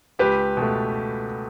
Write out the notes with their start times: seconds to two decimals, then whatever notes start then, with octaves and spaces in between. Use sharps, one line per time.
0.19 C#2 G4 B4
0.57 B2 A3